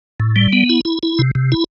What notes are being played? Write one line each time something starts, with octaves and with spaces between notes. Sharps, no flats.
A2
G3
B3
E4
E4
E4
C3
C3
E4